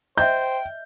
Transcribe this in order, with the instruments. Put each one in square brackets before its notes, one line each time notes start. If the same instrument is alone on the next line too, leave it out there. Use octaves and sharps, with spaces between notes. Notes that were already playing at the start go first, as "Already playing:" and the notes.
[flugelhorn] C5 [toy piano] D#5 E5 [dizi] G5 [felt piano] G6